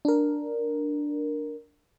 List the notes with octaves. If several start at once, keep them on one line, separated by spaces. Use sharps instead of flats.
D4 A#4